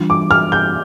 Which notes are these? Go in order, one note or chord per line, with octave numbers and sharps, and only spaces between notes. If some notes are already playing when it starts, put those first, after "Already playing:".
Already playing: E3 G3 D4 F4
D6
F6
G6